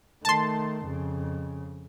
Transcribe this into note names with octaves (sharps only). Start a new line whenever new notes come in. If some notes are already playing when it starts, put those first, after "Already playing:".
D#3 A3 A5 C6
F2 C#3